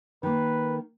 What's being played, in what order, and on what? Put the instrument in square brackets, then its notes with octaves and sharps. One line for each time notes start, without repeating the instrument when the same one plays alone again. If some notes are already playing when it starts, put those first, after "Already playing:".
[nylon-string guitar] D#3 A#3 [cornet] B4